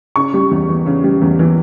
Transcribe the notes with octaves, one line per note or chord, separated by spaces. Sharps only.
C#3 C#6
G3
E2
E3
C#3
G3
E2
E3